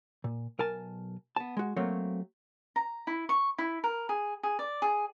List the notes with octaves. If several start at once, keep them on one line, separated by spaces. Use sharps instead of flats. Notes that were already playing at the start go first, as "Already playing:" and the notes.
A#2
B1 A#4 G#5 A5
B3 A5
G#3 F#4
F#3 A3 A#3 C4 C#5
A#5
E4
C#6
E4
A#4
G#4
G#4
D5
G#4